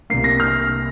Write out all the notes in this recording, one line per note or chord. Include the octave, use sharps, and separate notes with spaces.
C2 C3 G3 A#3 C7
A#6
F6